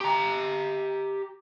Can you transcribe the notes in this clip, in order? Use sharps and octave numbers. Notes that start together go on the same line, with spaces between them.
G4 A#5